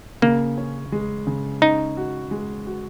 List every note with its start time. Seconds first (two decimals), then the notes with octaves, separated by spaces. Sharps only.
0.22 C#3 A#3
0.58 C#4
0.92 G#3
1.27 C#3
1.62 C#4 D#4
1.97 F#4
2.31 G#3
2.67 F#4